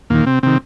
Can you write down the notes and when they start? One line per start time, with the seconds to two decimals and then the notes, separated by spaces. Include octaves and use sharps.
0.10 D#2 A#2 D#3 A#3
0.26 C3 C4
0.43 C3 D#3 C4